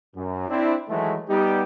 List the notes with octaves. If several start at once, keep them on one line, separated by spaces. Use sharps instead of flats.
F#2
C4 D4 E4
D#3 E3 F#3 G#3 A3
G3 B3 D#4 G4